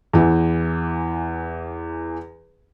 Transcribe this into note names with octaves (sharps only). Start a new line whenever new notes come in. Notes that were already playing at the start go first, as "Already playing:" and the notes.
E2 E3